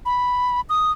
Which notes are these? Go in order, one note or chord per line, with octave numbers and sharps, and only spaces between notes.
B5
D#6